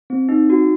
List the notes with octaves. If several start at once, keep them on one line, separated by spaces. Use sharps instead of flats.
C4
D#4
F#4